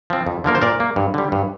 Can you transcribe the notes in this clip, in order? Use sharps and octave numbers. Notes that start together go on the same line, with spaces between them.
F3 C4
F2
D3 F3 A#3 A#4
C5
A#2 A#4 D5
A#3
G2
D3 G3
G2